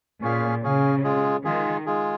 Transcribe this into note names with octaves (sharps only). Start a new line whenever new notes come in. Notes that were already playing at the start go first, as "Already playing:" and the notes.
A#2 C#4 G#4 F5
C#3 C#4 G#4 F5
G#3 F4 G#4
D#3 G#3 F4 G#4
G#3 F4 G#4